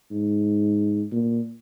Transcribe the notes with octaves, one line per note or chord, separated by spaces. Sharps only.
G#2
A#2